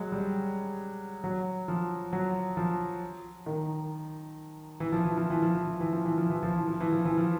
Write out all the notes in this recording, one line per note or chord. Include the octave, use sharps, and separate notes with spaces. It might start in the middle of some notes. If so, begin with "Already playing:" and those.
Already playing: F#3 G#3
G3
F#3
F3
F#3
F3
D#3
E3
F3
E3
F3
E3
F3
E3
F3
E3
F3
E3
F3
E3
F3
E3
F3
E3
F3
E3
F3